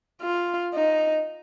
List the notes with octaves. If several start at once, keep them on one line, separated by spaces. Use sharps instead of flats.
F4
D#4